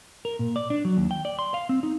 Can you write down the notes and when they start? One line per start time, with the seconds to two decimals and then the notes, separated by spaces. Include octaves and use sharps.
0.25 A#4
0.39 A#2
0.56 D5
0.70 D4
0.85 F#3
0.97 D#2
1.11 G5
1.25 D5
1.39 C6
1.54 F5
1.69 C4
1.83 D#4